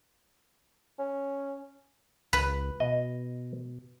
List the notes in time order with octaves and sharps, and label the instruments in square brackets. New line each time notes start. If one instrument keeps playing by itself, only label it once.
[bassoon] C#4
[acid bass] C#2 [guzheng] B4
[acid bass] B2 [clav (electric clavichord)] D#5